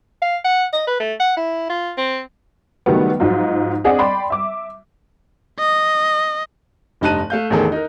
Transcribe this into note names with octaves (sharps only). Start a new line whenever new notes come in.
F5
F#5
D#5
B4
A3
F#5
E4
F4
C4
D#3 F#3 G3 A3 B3
G#2 F3 F#3 D#4 F4
C4 D4 G#4 D#5 F#5
D5 G5 B5 C6
E5 D6
D#5
F1 G2 D#4 A5 F#6 D#7
A3 F5 G6
A1 E2 D#3 G#4 A4
D#4 A#4